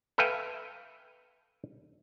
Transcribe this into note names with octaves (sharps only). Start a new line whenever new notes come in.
A4 B4 E5 F5 G5 G#5